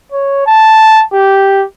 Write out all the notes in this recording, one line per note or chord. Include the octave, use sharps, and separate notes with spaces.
C#5
A5
G4